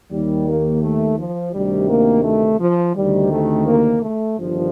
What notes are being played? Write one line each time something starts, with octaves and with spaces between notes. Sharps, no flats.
D#2 D#3 G3
A#3
A3
F3
D2 C3 D#3 G3
A#3
A3
F3
D2 C3 D#3 G3
A3
A#3
A3
G1 G2 D#3 F3